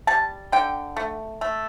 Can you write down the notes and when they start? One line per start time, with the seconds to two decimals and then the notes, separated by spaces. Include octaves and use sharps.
0.07 G3 A5
0.52 D3 G5
0.97 A3
1.41 A3